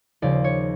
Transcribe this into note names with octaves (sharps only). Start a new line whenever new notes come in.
D#2 C#3 F3 D5
C#5